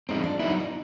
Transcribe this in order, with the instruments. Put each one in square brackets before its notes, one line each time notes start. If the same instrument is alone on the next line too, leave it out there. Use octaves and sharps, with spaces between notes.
[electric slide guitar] F3 G#3 C4 [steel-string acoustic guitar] D#4
[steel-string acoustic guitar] D4
[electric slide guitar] F#3 B3 E4 [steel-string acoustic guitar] D#4
[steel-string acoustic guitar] D#4
D#4